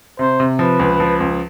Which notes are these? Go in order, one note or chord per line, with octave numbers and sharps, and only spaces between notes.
C3 C5
C3
F3 B4
C#2
F3
C#2